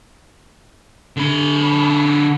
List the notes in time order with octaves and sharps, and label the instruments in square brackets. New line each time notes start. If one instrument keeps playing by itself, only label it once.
[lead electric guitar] D3 B5